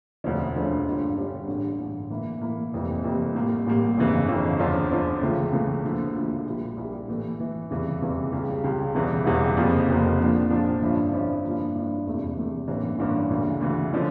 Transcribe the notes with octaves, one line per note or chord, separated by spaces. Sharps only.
E1 D2 D3 F3 C#4
E1 D2 D3 F3 C#4
G1 G2 D3 G3 C#4
G1 G2 D3 G3 C#4
A1 G2 D3
A1 G2 D3
A2 E3 A#3 E4
A2 E3 A#3 E4
F1 F2 E3 G3 A#3
F1 F2 E3 G3 A#3
A1 A2 G3 A#3
A1 A2 G3 A#3
G1 F2 C#3 E3
G1 F2 C#3 E3
E2 D3 F3 C#4 F4
E2 D3 F3 C#4 F4
C#2 C#3 E3 A3
C#2 C#3 E3 A3
D2 D3 F3 A#3
D2 D3 F3 A#3
A#1 A#2 G3 A#3 E4
A#1 A#2 G3 A#3 E4
A2 E3 A3
A2 E3 A3
F1 E2 C#3 E3 G3
F1 E2 C#3 E3 G3
C#2 C#3 G3
C#2 C#3 G3
E1 E2 C#3 E3 G3
E1 E2 C#3 E3 G3
F1 F2 C#3 F3 A#3
F1 F2 C#3 F3 A#3
A#1 A#2 F3 A#3 D4
A#1 A#2 F3 A#3 D4
G1 G2 F3 C#4 E4
G1 G2 F3 C#4 E4
G2 F3 A#3 E4
G2 F3 A#3 E4
F1 E2 E3 A3
F1 E2 E3 A3
A1 G2 E3 A#3 C#4
A1 G2 E3 A#3 C#4
D2 C#3 E3
D2 C#3 E3
D3 F3 C#4